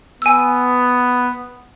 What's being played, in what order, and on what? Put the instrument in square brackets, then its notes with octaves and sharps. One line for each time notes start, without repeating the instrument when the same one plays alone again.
[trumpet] B3 [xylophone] G#5 E6